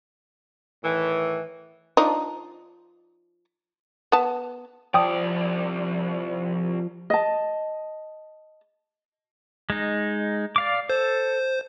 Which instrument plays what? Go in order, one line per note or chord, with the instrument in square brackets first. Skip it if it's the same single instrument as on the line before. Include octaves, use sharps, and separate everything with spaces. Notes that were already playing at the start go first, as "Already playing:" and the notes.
[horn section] A2 D#3 E3
[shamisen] F3 D4 D#4
B3 A5
[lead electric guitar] C2 D5 [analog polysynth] F3 [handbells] G5 D#6
[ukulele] D#5 A5
[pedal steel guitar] G#3 D#4
D5 F5 D6
[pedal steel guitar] A4 [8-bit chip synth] C5